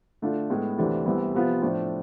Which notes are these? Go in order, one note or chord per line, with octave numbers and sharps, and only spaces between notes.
D3 A3 D4 F4
A2 G#3 B3
D2 C3 E3 A3 D4
C2 C3 E3 B3
C3 F3 B3 F4
A2 F3 A3 D4